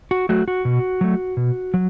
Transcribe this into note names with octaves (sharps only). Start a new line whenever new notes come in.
F#4
F#3 A3 F#4
F#4
B2
F#3 A3
B2
F#3